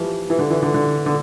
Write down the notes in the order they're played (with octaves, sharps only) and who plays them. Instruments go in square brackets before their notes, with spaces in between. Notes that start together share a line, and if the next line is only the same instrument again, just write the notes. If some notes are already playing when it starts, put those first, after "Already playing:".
Already playing: [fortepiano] E3 F3 G3
E3
D3
E3
D3
D3
D3